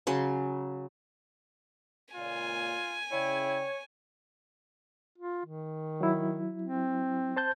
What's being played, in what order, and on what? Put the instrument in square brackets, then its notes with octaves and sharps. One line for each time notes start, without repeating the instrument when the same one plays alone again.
[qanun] C#3 F#3 C6
[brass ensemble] C#2 A#2 [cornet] F4 [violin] G#5
[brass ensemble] C#3 D5 G5 [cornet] E4 [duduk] C#5
[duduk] F4
D#3
[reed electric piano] F#3 E4
[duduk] C4
[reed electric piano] C5 A5 G6